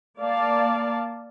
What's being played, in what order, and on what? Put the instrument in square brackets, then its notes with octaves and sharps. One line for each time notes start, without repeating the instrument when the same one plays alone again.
[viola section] A#3 D5 F5 A5